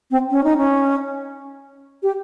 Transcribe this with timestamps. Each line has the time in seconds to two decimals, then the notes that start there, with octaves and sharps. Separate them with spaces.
0.11 C4
0.30 C#4
0.44 D#4
0.57 C#4
2.03 G4